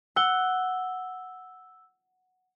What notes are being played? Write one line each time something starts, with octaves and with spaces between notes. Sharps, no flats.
F#5 E6 G7